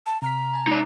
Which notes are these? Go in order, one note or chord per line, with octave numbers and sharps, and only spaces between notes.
A5
C3 A#5 F6 B6
G#5 A5
G#3 D#4 D5